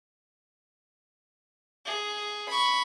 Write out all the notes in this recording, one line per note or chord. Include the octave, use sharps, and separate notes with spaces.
G#4
B5 C#6